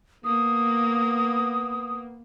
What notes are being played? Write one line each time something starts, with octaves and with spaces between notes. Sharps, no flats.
A#3 B3 D#6